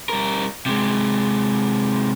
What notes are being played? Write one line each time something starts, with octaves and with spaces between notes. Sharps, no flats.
G3 A#4
C3 G#3